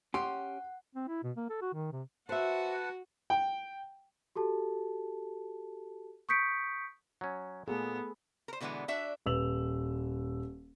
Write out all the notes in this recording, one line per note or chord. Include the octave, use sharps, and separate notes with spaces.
C#4 G4 F#5 C6
C4
E4
B2
A#3
A4
F#4
D#3
C3
F#4 B4 C5 E5 F#5 A5
G5
F#4 G4 A4 A5
C#6 D#6 G6 B6 C#7 D7
F#3 C#4
A#2 A3 B3 G#4 A4
A#4 C5
B2 D3 E3 G#3 B3
D4 F#4 E5
D#1 B4 E6 F7 F#7